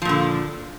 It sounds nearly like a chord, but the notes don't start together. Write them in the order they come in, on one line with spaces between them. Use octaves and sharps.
F3 A#2 D3